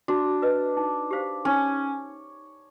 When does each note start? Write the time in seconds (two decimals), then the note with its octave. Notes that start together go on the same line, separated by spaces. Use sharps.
0.08 D4 F#4
0.42 B4 D#5
0.77 D#4
1.11 G4 C5 F5
1.45 C#4 D#4